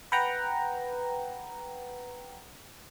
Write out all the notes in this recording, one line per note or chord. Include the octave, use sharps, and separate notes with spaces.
B4 F#5 G5 A#5